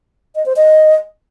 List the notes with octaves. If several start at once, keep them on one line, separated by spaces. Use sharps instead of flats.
D#5
C5
D#5